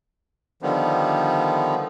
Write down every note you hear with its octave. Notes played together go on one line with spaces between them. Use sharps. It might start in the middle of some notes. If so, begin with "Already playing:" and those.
D3 D#3 F3 G3 B3